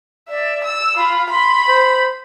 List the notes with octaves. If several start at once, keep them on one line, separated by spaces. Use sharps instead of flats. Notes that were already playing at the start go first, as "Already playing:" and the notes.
D5 E5
E6
F4 B5
B5 C6
C5